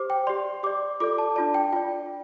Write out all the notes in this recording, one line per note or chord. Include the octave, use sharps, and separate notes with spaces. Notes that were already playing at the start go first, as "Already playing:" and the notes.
Already playing: G4 C5 D6
G5
G4 D5 C6
G4 D5 D6
F4 A4 D5 D6
A5
D4 F4 D5 A5
G5
F4 D5 G5